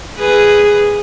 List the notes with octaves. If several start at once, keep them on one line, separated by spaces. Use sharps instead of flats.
G#4 B4